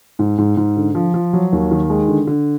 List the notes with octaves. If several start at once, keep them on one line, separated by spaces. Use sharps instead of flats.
G#2
G#2
G#2
D3
F3
F3
F#3
D#2
D#3
G#3
D3
D3